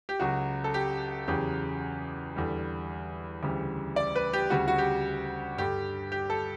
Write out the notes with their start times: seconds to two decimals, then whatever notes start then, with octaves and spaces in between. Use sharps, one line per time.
0.09 G4
0.20 C#2 C#3 F#3 F#4
0.64 A4
0.74 G4
1.28 E2 C#3 F#3 G4
2.36 E2 D3 G3
3.43 D2 C#3 E3 G3
3.96 D5
4.16 B4
4.33 G4
4.50 D2 C#3 G3 F#4
4.68 F#4
4.78 G4
5.58 G2 D3 G3 G4
6.12 G4
6.30 A4